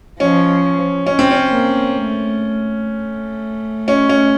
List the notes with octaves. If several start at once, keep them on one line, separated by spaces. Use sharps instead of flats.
F3 C#4
C#4
C4
C#4
A#3
A3
A3
C#4
C#4